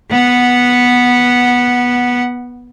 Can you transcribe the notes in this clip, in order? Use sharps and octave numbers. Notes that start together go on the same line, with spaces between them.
B3 F#5